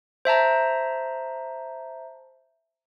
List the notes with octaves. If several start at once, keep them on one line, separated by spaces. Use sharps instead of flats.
C5 E5 A5 A#5